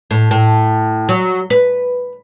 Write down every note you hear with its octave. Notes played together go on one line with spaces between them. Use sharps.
A2
A2
F#3
B4